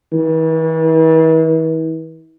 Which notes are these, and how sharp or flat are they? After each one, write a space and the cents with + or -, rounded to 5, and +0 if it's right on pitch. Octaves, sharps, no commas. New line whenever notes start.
E3 -40